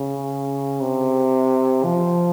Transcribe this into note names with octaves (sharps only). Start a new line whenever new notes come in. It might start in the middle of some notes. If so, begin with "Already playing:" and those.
Already playing: C#3
C3
F3